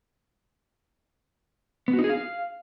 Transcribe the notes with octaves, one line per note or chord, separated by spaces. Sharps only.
B3
F#4
D#4
G#4
F5